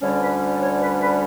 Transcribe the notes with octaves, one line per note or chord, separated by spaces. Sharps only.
D2 D3 G3 C#4 C#5
B4
D5
C#5
B4
B4